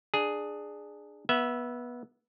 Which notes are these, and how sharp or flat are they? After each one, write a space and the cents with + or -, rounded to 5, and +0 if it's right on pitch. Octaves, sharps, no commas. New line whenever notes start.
D4 +20 G#4 +0
B3 -20 E5 +0